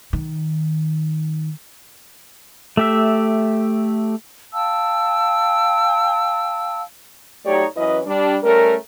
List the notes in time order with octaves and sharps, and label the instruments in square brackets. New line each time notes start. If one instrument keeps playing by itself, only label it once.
[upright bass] D#3
[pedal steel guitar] A3 G4 E5
[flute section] F5 G5 A5 E6
[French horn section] F#3 A3 D#4 G4 C#5 D5
F#2 E3 C#4 E4 B4 D#5
G3 D4
G3 A3 C#4 A#4